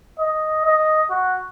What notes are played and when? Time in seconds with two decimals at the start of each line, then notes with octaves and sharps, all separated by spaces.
0.20 D#5
0.65 D#5
1.10 F#4